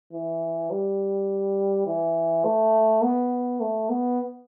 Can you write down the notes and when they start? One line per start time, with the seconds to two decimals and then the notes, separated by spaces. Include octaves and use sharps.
0.13 E3
0.71 G3
1.87 E3
2.45 A3
3.03 B3
3.60 A3
3.90 B3